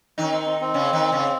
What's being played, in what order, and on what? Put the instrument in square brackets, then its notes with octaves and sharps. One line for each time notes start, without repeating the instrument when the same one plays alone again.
[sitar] D#3 D#4 [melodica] C#4
[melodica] C4
C4
C4
[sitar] C#3 C#4
D#3 D#4
C#3 C#4